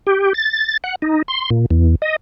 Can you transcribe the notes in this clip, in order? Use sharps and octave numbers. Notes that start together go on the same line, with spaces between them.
G4
A6
F#5
D#4
C6
A#2
E2
D#5